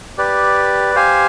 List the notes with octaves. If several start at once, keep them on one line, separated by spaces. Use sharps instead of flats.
G4 B4 D5
G4 C5 F5 G#5